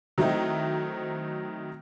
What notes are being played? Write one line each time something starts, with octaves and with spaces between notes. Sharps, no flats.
D#3 F#3 A3 C4 D#4 E4